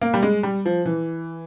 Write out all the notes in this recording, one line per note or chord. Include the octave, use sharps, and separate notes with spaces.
A#3
G3
G#3
G3
F3
E3